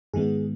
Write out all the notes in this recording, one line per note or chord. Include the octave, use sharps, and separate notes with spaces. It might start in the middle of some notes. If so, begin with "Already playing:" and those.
G#2 D#3 G#3 B3 G#4